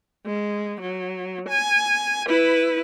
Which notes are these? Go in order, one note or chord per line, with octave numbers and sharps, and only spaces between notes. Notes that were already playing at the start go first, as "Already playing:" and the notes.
G#3
F#3
G#5
E4 B4